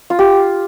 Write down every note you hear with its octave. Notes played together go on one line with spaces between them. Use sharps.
F4
G4